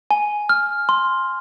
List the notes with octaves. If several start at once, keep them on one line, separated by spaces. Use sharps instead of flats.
G#5
F6
C6